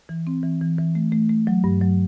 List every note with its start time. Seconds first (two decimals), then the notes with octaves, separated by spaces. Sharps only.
0.09 E3
0.27 C4
0.43 E3
0.61 E3
0.78 E3
0.95 A3
1.12 A3
1.29 A3
1.47 F#3
1.64 G2
1.81 F#3